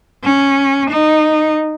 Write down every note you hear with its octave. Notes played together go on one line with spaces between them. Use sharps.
C#4
D#4